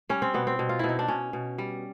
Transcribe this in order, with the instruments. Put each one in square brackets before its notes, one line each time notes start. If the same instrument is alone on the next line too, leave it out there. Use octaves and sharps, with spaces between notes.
[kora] G3 C#4
C4
B2 B3
C4
B2
F4
B2 E4
D#4
D4
B2 C#4
B2
G3